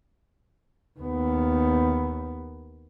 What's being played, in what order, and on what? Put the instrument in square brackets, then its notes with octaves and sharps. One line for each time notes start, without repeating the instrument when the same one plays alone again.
[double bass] D#2 B3